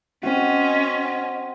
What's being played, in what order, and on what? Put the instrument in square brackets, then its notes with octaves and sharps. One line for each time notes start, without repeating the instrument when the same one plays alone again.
[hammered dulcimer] C4 F#4 [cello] C#4 D#5